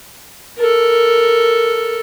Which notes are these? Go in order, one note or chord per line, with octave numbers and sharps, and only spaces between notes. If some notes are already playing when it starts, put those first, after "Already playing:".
A4 A#4